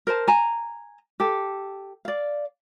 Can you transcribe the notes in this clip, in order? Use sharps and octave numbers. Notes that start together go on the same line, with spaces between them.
A#4 C5 A5
G#5 A#5
G4 A4
D5 F5